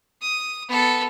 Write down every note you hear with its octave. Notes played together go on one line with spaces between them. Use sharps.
D#6
B3 A4